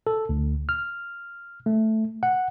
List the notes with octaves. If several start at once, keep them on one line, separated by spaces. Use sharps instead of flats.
A4
D2
F6
A3
F#5